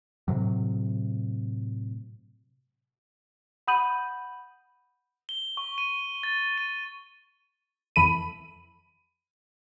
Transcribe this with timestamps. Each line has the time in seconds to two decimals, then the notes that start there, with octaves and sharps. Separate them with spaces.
0.28 A2 C3 F#3
3.67 F#5 B5 D#6 G6 D#7 F#7
5.29 G7
5.57 C#6
5.78 D#7
6.23 A6
6.58 D#7
7.96 F2 E3 A4 B5 D#7